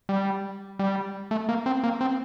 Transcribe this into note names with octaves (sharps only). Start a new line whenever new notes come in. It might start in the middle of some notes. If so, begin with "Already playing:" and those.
G3
G3
A3
A#3
C4
A#3
C4